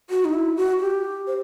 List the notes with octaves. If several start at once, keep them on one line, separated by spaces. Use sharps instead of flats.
F#4
D#4
E4
F#4
G4
C5